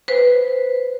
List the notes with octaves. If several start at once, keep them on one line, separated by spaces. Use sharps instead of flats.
B4 C5